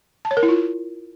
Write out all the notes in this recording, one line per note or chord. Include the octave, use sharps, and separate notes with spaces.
A5
C#5
A#4
E4
F4